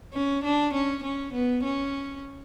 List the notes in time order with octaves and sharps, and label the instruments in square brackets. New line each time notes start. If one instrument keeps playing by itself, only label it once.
[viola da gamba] C#4
D4
C#4
C#4
B3
C#4